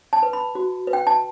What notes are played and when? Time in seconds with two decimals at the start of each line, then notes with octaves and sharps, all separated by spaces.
0.13 A5
0.23 B4
0.33 B5
0.55 F#4
0.87 B4
0.93 G5
1.07 A5